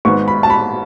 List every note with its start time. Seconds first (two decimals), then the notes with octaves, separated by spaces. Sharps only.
0.05 G#1 G#2 G#3 B3 C#6
0.28 B5
0.43 A5
0.50 B5